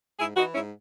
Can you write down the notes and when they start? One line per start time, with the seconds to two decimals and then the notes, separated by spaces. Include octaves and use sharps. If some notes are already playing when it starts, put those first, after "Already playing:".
0.18 G#2 E4 G#4
0.36 E3 D#4 F#4
0.53 G#2 C#4 E4